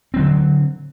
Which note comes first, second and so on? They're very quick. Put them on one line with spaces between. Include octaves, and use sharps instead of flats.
C4 F#3 D3